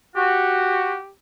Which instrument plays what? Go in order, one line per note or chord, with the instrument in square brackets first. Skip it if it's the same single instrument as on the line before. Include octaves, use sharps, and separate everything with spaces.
[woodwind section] F#4 [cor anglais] G4